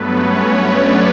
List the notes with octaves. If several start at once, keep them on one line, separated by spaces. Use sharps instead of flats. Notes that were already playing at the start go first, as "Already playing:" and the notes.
Already playing: G2 F#3 A3 B3 B4
C#4 C#5
D4 D5